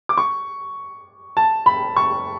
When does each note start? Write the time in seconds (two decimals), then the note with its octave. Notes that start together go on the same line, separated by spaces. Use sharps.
0.09 D6
0.18 C#6
1.37 A5
1.66 B5
1.96 C#6